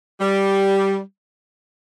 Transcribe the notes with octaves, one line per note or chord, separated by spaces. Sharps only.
G3